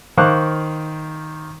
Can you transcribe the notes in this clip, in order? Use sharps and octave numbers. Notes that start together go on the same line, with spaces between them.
D#3 C5 F5 C#6 D6 F#6